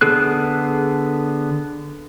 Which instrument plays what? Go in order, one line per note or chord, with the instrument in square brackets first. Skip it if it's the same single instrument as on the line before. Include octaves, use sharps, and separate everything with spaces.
[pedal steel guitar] D3 B3 G#4 A4 F#6